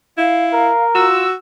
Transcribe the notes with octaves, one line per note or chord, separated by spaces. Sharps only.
E4 F5
A#4
F4 F#4 E6